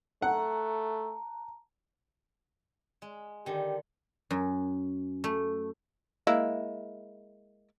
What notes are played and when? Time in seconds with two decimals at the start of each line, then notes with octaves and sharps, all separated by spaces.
0.22 A3 F#5 A5 A#5
3.02 G#3
3.46 D3 D#3 G4
4.31 F#2
5.24 A3
6.27 G#3 A#3 E4